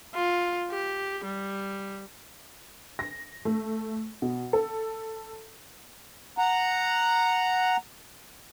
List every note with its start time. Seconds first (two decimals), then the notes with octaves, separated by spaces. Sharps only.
0.15 F4
0.71 G4
1.25 G3
2.99 A#6
3.45 A3
4.22 B2
4.53 A4
6.38 F#5 A#5